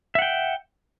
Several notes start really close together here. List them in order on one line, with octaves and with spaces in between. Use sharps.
E5 F#5 G5